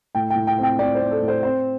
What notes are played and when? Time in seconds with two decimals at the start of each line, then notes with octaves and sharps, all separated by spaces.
0.15 A2 G5
0.30 G5
0.35 A2
0.47 G5
0.58 C4
0.63 G5
0.79 C4 D5
0.95 C5
1.01 C4
1.11 A4
1.22 A2
1.28 C5
1.43 C4 C5